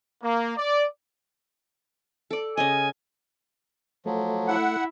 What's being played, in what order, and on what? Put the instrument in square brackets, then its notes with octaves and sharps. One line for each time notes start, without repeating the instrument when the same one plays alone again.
[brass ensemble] A#3
D5
[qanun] A4 D5
[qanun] C#3 D#5 [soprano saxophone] G#5
[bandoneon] F3 F#3 [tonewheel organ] A3
[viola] E4 [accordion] F#5